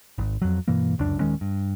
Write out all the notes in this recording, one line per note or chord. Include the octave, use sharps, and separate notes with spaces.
G#1
F2 F#3
G2 B2 E3 A#3
F1 C#2 F#2 D4
D#1 D#3 G#3 C#4
G2